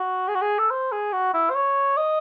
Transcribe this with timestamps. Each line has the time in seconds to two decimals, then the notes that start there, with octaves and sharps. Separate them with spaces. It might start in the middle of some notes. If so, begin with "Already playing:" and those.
Already playing: F#4
0.28 G#4
0.35 F#4
0.42 G#4
0.59 A4
0.71 C5
0.92 G#4
1.13 F#4
1.34 E4
1.50 C5
1.55 C#5
1.97 D#5